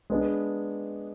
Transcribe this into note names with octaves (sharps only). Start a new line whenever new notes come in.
G#3 B3 D4